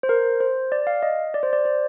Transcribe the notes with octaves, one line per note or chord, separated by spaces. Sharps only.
C5
A#4
C5
D5
F5
D#5
D5
C5
D5
C5